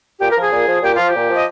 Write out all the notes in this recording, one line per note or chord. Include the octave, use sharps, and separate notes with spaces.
A#2 G4
A#4
F3
G#4
A#2
F3
A#2 G4
F3 F4
G4
A#2
F3 D#5